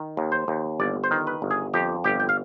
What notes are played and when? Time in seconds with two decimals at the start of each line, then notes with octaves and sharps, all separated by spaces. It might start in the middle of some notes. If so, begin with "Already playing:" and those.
Already playing: D#3
0.17 D#2
0.32 C5
0.48 D#2
0.80 G1 D5
1.04 C5
1.11 D#3
1.27 B4
1.42 G1
1.51 G#4
1.74 F2 G4
2.04 G1 G4
2.20 G5
2.29 F5